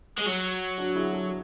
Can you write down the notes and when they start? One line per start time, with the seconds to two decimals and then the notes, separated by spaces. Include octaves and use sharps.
0.18 G#3
0.26 F#3
0.78 D4 F#4
0.95 E4 G#4
1.13 F#4 A4